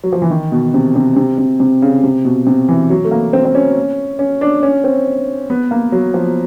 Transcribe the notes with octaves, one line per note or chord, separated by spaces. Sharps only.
F#3
F3
E3
D#3
B2
C3
C3
C3
C3
C3
C#3
C3
B2
C3
E3
F#3
A3
A#3
C4
C4
C#4
C#4
D4
C#4
C4
B3
A#3
F#3
F3